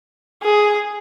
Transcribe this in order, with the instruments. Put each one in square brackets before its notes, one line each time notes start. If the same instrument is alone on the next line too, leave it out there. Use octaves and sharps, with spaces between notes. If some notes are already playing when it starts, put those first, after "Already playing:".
[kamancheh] G#4